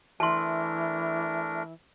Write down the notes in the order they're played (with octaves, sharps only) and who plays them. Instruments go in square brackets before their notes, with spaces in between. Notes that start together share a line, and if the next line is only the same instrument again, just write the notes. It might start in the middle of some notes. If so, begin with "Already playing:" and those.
[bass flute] E3 [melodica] A3 D4 A#4 [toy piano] A5 C6